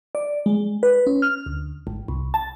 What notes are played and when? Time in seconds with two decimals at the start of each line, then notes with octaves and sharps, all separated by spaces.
0.15 D5
0.46 G#3
0.83 B4
1.07 C#4
1.22 F6
1.46 D2
1.87 G#1
2.08 C2
2.34 A5